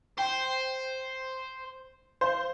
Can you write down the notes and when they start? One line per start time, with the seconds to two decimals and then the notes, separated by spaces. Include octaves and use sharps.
0.18 C5 G5
2.21 C5 F5